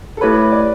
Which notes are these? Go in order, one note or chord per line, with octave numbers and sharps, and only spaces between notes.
A4
A3 E4 G4 B4 C#5
D5